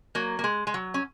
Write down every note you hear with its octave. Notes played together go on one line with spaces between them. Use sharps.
F#3 A#3
A#3
G#3
G#3
F#3
C#4